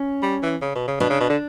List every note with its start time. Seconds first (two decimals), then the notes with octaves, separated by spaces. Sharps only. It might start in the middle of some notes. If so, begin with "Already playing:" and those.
Already playing: C#4
0.23 G3
0.43 E3
0.62 C#3
0.75 B2
0.88 C#3
1.00 B2 D4
1.10 C#3
1.20 B2
1.30 D3